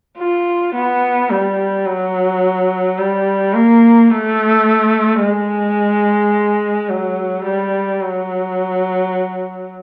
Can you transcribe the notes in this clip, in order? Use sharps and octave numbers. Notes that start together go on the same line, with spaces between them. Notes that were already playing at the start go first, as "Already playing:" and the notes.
F4
B3
G3
F#3
G3
A#3
A3
G#3
F#3
G3
F#3